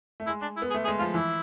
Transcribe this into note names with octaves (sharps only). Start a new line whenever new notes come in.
A3
G#3 E4
D4
E4
B3
G#4
A3
G#4
G#3
F3 F4
E3 E4